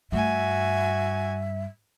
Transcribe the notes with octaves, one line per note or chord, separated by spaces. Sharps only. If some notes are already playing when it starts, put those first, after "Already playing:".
G2 A3 F#4 E5 G#5